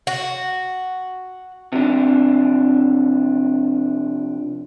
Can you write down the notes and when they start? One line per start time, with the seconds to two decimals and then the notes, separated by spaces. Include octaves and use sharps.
0.07 F#4
1.72 C3 F3 D4